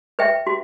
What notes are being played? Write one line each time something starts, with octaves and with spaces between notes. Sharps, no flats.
B4 E5 G5
F#4